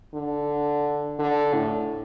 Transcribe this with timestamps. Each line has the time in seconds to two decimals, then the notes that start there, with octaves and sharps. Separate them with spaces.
0.14 D3
1.19 D3
1.54 A2